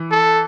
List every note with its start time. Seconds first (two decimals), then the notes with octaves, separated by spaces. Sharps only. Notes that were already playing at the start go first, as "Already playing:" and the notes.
Already playing: E3
0.11 A4